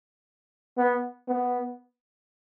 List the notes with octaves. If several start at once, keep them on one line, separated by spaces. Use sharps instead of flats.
B3
B3